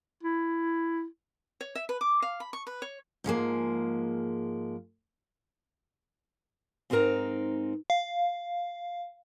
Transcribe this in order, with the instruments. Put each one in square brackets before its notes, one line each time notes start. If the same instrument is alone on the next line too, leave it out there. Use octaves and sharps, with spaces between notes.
[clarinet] E4
[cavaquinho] C#5
E5
B4
D6
F5
B5
C#6
B4
C#5
[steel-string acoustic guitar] G#2 F3 G#3 A#3
G#2 C4 D#4 G4 A#4 A#5
[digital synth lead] F5